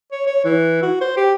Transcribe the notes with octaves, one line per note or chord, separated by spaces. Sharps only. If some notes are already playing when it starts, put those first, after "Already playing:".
C#5
C#5
E3
F#4
C5
G4